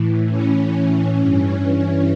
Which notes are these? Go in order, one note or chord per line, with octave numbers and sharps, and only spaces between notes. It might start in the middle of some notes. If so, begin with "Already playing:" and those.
Already playing: A2 E3
C#4
G2 E3